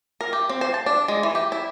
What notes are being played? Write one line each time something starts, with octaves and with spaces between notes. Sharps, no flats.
A#4
G4
C4
C5
A5
D4
G#3
E3
G4
E4